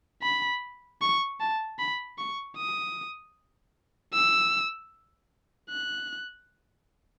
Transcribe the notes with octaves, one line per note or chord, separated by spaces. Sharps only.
B5
C#6
A5
B5
C#6
D#6
E6
F#6